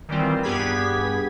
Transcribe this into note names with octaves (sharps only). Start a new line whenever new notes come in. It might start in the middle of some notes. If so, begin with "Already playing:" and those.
D#3 E3 G3 C4 F4
G2 B3 G4 G#4 G#6 B6